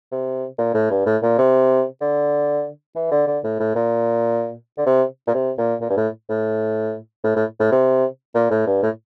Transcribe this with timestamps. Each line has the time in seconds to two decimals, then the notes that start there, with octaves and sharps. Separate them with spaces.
0.12 C3
0.58 A#2
0.74 A2
0.90 G2
1.06 A2
1.22 A#2
1.38 C3
2.01 D3
2.96 E3
3.12 D3
3.27 D3
3.44 A2
3.60 A2
3.75 A#2
4.77 D3
4.86 C3
5.27 A#2
5.34 C3
5.58 A#2
5.81 A#2
5.90 G2
5.97 A2
6.30 A2
7.24 A2
7.36 A2
7.60 A2
7.72 C3
8.35 A#2
8.51 A2
8.67 G2
8.83 A2